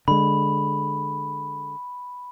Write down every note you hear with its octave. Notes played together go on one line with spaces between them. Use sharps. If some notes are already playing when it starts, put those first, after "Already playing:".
D3 G#3 B5